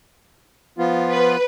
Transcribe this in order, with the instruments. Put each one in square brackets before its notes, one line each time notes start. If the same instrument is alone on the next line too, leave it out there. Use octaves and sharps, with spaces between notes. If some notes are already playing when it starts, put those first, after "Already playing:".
[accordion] F3 B3 F4
[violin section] B4